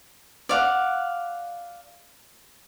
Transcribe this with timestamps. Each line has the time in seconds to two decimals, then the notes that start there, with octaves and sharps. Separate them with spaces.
0.49 D5 F5 F#5